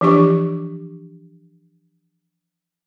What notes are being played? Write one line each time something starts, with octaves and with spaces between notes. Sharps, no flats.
E3 F3 D4 G4 C#6